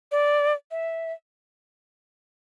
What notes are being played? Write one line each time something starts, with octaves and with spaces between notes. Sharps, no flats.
D5
E5